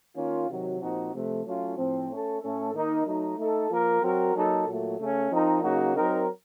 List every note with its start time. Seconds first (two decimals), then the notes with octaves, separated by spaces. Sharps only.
0.15 D#3 A#3 C#4 F4
0.47 C3 D#3 F#3
0.80 A#2 F3 C4 D#4 F#4
1.12 C3 F3 A3
1.44 F#3 A3 C#4 F4
1.76 A2 F3 C4
2.09 A3 C#4 A4
2.40 A2 A3 C#4 A4
2.72 D#3 A#3 D#4 A#4
3.05 F#3 A3 D#4
3.37 A3 D#4 A4
3.69 F3 A#3 F4 A#4
4.01 F#3 C4 F#4 A#4
4.34 F#3 A#3 D#4 A4
4.66 A#2 F#3 A3
4.98 C#3 A3 C#4
5.30 F3 C4 D#4 A#4
5.62 C#3 F#3 A#3 D#4 F#4
5.95 F#3 C4 D#4 A#4